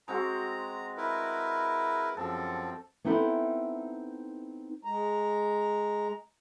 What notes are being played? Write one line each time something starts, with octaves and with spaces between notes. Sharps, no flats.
G#3 C4 F#4 A#5
E4 A#4 B4
F#2 F3 C4 A4
B3 C4 D#4 E4 G#4 A4
G#3 A#5